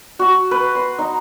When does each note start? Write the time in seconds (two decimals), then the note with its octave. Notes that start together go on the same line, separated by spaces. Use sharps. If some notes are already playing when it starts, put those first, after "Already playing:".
0.19 F#4
0.51 B4
0.75 C6
0.99 D#4